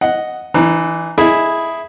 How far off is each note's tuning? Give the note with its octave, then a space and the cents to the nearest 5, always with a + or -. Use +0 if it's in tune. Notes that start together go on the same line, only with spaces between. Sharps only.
D#5 +0 F#5 +0
E3 +0 D#4 -45 A#5 +0
E4 +0 G#4 +0 D#5 +0